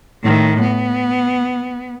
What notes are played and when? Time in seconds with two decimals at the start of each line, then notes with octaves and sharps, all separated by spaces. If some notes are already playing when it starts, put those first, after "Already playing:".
0.23 A2 D#3
0.61 B3